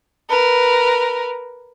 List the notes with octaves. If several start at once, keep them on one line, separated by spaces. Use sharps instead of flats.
A#4 B4